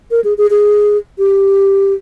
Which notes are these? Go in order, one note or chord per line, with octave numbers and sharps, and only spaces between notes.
A#4
G#4
G#4
G#4
G4